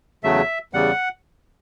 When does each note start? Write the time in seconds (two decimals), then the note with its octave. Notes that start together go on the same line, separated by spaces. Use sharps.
0.24 E2 C#3 F#3 A3 E5
0.73 E2 C#3 G3 F#5